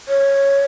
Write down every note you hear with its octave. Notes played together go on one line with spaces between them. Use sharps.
C#5